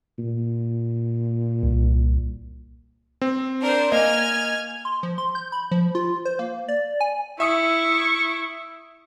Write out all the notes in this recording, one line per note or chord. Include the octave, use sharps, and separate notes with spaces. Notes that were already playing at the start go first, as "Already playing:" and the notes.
A#2
C2
C4
D4 A#4 C5
A#3 D#5 G#5 F6 G#6
C6
F3
C6
G6
B5
F3
F4
C5
A#3
D5
G#5
E4 E5 C#6 D#6 C#7